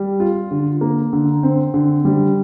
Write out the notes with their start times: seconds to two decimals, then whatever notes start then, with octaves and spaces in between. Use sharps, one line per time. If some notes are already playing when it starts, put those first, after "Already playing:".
Already playing: G3
0.20 F4
0.51 D3
0.81 A#3
1.13 D3
1.43 C4
1.74 D3
2.05 G3